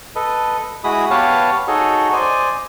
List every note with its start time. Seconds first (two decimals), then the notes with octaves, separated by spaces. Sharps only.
0.15 A4 B4 D#5
0.84 G#3 E4 F#4 G#4 B5 D#6
1.11 B3 G4 B4 C#5 F5 A5
1.67 D#4 F#4 G#4 A4 C#5 D#5
2.13 C5 D5 D#5 G#5